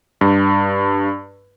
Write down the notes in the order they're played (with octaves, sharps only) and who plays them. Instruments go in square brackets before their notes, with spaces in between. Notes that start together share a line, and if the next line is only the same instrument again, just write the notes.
[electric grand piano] G2